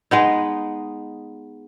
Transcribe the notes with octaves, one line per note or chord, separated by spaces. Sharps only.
G#3 B3 D#4